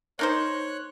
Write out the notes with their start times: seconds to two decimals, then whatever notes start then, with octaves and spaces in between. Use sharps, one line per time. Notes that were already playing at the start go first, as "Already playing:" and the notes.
0.19 A#3 D#4 C5 C#5 F#6